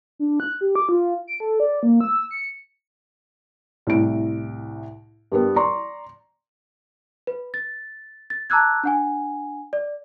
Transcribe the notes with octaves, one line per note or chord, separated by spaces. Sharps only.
D4
F#6
G4
D6
F4
D7
A4
D5
A#3
E6
C#7
C2 A2 D7
G2 G3 B3
D5 A#5 C6 C#6
B4
A6
A6
A5 A#5 D6 E6 F#6 G#6
D4 F#5 G#5
D5